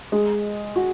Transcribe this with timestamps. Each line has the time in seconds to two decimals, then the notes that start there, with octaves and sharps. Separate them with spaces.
0.12 G#3
0.76 F#4